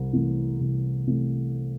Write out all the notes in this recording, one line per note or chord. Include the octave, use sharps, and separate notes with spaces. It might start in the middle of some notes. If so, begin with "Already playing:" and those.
Already playing: C2
C3 E3 A3
C2
C3 E3 A3